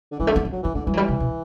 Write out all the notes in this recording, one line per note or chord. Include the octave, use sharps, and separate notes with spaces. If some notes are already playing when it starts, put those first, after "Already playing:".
D3
E3 G3
A3
D3 B3
C4
F#3
E3 B3
D3 A3
E3 G3
F#3
G3
C3
B2